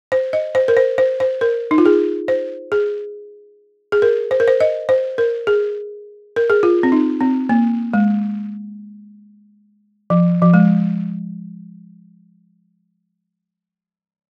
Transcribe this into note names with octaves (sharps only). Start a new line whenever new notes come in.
C5
D#5
C5
A#4
C5
C5
C5
A#4
D#4
F4
G#4
C5
G#4
G#4
A#4
C5
A#4
C5
D#5
C5
A#4
G#4
A#4
G#4
F4
C4
D#4
C4
A#3
G#3
F3
F3
G#3